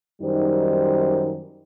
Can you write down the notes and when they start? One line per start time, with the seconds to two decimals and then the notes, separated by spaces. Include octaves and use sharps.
0.22 F#2 D#3 G3 D#4 C5